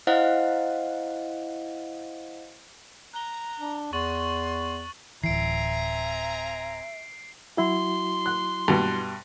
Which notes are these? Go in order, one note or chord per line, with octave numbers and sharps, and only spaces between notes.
E4 C5 D#5 F5 F#5
A#5 F#6 G7
D4
E2 C6 C#6 A6 F#7
D1 E3 C4 E5 G#5 A#5 C7 D7
F#3 E4 F#4 C6
F#6
G2 B2